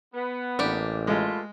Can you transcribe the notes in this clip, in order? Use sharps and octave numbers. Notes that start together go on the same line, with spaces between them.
B3
A1 A#3 D4 G4
G#3 A3 F4 B4